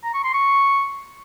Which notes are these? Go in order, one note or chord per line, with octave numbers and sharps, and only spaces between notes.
A#5
C#6
C6
C#6